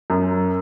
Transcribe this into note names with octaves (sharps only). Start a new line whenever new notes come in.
F#2